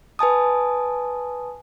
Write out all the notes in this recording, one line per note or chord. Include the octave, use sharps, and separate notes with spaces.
B4 G#5 A5 D#6